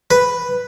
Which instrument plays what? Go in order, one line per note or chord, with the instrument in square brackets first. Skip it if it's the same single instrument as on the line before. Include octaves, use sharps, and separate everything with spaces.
[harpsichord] B4